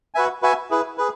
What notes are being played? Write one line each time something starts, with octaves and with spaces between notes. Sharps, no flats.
F#4 B4 E5 G#5
F#4 B4 E5 G#5
E4 G#4 B4
G#4 B4